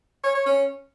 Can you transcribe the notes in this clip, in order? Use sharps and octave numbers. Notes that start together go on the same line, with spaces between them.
C#5
C#5
C#4